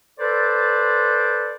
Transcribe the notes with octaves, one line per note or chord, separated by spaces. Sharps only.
A4 B4 C5 D5